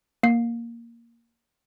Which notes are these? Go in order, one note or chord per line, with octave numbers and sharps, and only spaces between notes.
A#3 C7